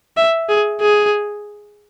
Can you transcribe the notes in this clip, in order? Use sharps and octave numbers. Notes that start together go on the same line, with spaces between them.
E5
G#4
G#4